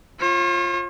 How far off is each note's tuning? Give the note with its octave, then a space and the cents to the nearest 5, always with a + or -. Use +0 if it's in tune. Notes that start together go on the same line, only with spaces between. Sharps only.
F4 +0 C#5 -45